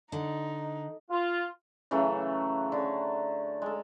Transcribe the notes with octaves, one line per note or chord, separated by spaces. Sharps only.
D3 D#4
F4
C#3 E3 F#3 A3
D3
G#3 A4